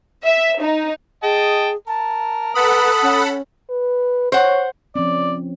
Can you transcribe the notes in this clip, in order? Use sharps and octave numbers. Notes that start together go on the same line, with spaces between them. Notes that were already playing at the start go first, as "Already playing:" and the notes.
E5
D#4
G#4 D#5 G5 A5
A#4 A5
A4 B4 F#5 B5 D#6
C#4
B4
C5 C#5 F#5
F3 C4 C#4 D5